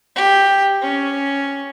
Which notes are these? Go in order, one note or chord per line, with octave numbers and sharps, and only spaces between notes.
G4
C#4